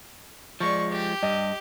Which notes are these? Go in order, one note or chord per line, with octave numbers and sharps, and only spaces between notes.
F3 G#3 D5 C#6
G4
G2 D#5